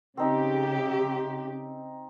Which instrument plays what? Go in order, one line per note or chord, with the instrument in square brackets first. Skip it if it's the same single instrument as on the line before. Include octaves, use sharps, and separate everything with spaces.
[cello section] C#3 G4 [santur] C4 D#4